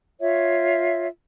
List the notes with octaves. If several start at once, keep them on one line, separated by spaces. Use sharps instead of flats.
F4 C#5 E5